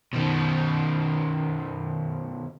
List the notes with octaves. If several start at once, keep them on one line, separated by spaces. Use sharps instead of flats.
B2 D#3